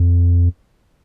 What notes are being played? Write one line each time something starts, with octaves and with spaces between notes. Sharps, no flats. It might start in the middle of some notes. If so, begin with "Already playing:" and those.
Already playing: F2